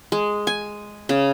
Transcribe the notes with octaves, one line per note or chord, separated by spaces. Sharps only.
G#3
G#5
C#3